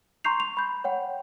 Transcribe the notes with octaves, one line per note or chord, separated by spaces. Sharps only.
A#5 C6 C#6 G6 C7 F7
F7
B5 G6
C#5 F#5 G5